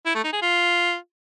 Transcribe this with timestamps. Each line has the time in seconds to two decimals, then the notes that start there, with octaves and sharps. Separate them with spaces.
0.06 E4
0.15 A3
0.24 D#4
0.33 G#4
0.42 F4